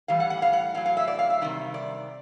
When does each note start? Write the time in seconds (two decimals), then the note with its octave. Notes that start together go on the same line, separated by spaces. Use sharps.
0.08 A2 E3 G3 F5
0.20 F#5
0.30 F#5
0.42 F5
0.53 F#5
0.74 A2 F#3 F5
0.86 F5
0.97 E5
1.07 D5
1.19 F5
1.30 E5
1.41 C3 D#3 G3
1.74 D5